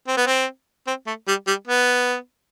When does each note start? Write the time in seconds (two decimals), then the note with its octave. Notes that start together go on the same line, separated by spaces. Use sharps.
0.07 C4
0.17 B3
0.27 C4
0.87 C4
1.07 A3
1.28 G3
1.47 G3
1.67 B3